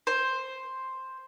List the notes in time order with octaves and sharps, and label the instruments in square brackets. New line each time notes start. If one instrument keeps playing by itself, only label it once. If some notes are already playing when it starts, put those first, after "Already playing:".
[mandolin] C5